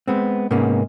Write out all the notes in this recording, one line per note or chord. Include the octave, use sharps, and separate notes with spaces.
G#3 B3 C4
G#2 C3 A#3 B3 C#4